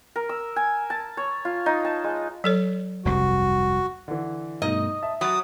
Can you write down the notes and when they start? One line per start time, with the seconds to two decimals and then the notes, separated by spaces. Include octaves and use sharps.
0.16 A#4
0.29 E6
0.56 G#5
0.90 A5
1.17 C#5
1.45 F4
1.66 D#4
1.85 A5
2.04 G#3
2.44 F#3 A4 C#5
3.05 F1 C2 G2 F#4
4.08 D3 E3
4.62 G2 B2 A3 D#4 D#5
5.03 E5 A5
5.21 F#3 B5 D#6 A6